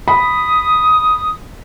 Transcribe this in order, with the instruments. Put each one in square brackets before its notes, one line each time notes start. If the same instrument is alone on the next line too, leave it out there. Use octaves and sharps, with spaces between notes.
[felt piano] B5 [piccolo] D#6